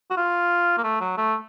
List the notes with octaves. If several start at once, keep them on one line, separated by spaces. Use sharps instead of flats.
F#4
F4
A#3
A3
F#3
A3